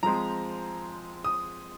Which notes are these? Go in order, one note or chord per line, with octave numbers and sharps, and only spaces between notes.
F3 G#3 C4 A#5
D#6